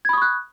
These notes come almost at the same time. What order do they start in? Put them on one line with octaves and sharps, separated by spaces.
G#6 B5 D#6 C#6 F#6